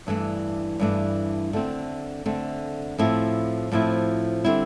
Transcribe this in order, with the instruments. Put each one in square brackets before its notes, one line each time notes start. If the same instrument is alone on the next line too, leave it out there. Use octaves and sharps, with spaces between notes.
[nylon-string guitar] G2 E3 A3 D4
G2 E3 A3 D4
D3 A3 C4
D3 A3 C4
A2 F3 C4 E4
A2 F3 C4 E4
D3 G3 C4 E4